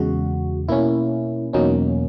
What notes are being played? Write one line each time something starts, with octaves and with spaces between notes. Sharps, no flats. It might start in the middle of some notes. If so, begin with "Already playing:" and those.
Already playing: E2 C#3 G#3 F#4
B2 A#3 C#4 E4
E2 B2 F#3 A#3 C#4 D#4